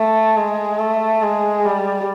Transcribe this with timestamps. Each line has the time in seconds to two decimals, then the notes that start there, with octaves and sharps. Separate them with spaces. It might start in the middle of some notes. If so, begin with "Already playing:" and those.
Already playing: A3
0.36 G#3
0.79 A3
1.22 G#3
1.65 G3